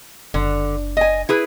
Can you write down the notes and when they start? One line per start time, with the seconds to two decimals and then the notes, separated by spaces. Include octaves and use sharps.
0.34 F#1 D3
0.97 D#5 G#5
1.29 E4 G#4 B4